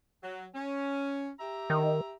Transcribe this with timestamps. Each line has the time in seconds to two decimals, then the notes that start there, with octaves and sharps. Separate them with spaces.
0.23 F#3
0.54 C#4
1.40 G4 E5 A#5
1.70 D#3